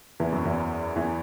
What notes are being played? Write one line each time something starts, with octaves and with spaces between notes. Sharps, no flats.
E2 E3
F#2 F#3
E2 E3
E2 E3